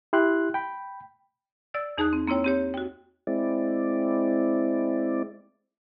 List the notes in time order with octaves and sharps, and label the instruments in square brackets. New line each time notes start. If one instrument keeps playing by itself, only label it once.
[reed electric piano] E4 G4 C6 F#6
G5 B5
[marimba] D5 E6 A6
E2 D#4 G#4 A5 D#6 F#6
C4
A#3 C4 E4 C#5 G5
C4 G4 C#5
F#4 G5
[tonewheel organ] G#3 C4 E4 D5